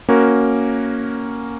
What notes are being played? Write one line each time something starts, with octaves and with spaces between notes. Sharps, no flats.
A#3 C#4 F#4 A#4